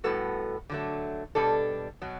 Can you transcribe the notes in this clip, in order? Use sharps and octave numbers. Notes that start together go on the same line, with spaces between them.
A2 G3 B3 F#4 A4
D3 F#3 A3
B2 G3 D4 A4
B2 F#3